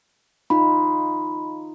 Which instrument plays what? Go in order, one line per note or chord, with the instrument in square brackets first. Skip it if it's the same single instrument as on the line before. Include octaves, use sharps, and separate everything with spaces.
[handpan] D#4 F4 [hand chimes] B5